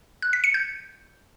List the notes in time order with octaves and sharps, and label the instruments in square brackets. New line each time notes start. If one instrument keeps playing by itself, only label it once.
[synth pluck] F#6
B6
C#7
G6